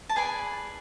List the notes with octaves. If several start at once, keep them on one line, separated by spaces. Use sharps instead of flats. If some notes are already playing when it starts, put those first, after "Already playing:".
A5
G#4 B4 D5 G#5